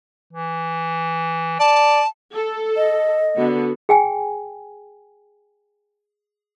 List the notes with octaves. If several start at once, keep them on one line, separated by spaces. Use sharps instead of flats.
E3
D5 A5
A4
D#5
D3 B3 F#4
G#4 G5 G#5